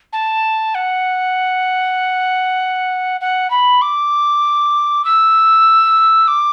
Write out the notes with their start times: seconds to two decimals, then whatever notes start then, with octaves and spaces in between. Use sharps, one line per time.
0.13 A5
0.75 F#5
3.21 F#5
3.50 B5
3.82 D6
5.05 E6
6.28 D6